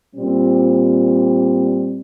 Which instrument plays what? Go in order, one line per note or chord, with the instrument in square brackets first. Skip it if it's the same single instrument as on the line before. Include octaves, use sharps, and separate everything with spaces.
[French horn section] A#2 G3 C4